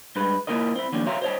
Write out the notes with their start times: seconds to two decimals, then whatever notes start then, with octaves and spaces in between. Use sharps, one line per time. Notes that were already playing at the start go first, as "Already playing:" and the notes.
0.16 G2 G#3 B4
0.47 A#3 E4 F4 A#4 D#5
0.76 C4 E4
0.92 D#3 F3 G3 A#3 C#4 D4
1.06 F#4 C#5 E5 F5 A#5 C6
1.22 C5 C#5 D#5 A5